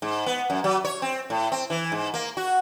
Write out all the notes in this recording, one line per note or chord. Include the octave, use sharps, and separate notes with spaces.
G#2
B3
F#2
F#3
C#5
C4
A2
C4
E3
G#2
A#3
F#4